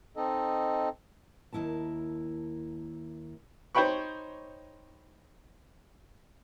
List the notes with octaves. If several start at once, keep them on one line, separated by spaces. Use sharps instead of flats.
C4 D#4 A4 D#5
D#2 A#2 E4 A#4 A5
D#4 C5 C#5 G5 B5 C#6